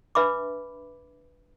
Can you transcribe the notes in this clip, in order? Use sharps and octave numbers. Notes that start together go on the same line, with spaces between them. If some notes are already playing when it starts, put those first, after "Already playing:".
D4 B4 E5 B5 D6